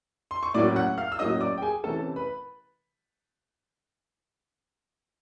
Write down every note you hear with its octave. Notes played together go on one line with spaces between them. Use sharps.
C6
C#6
A2 F#3 A#3 C#4 D5 D6
F#5 F#6
F5 F6
E6
A2 F#3 A#3 C#4 D#5 D#6
D5 D6
G5
G#4 G#5
C3 E3 A3 C#4 A4 A5
B4 B5